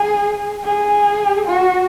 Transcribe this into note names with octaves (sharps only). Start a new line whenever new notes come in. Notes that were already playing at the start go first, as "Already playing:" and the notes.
Already playing: G#4
G#4
F#4